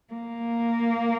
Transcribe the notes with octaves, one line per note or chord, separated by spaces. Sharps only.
A#3